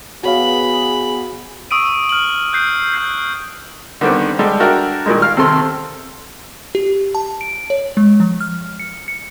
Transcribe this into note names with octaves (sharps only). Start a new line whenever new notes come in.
B3 F#4 G#4 C#5 F5 B5
C#6 D#6 E6 D7 D#7
F6 F#7
F#6 G6 C7
F6 G6 C7
D3 D#3 G3 B3 C4
G3 G#3 G4 A4
D4 F#4 A#4 E5 G5
A#2 D#3 G3 G#3
F5 F6
D#2 C3 C4 A4 C6
G4
A5
D7
C#5
G#3
F3
F6
C#7
C#7